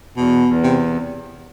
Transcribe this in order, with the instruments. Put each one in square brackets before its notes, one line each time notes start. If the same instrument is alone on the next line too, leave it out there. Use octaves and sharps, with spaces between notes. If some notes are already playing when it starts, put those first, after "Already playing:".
[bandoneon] E2 [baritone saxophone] B2
[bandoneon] E2
[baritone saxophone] C3